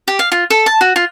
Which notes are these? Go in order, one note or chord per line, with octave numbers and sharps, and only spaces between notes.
G4
F5
F4
A4
A5
F#4
F4